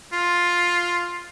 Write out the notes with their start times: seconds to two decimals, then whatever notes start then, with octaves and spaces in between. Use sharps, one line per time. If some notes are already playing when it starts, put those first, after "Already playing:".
0.13 F4